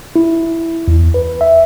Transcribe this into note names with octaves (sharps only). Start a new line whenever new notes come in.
E4
E2
B4
E5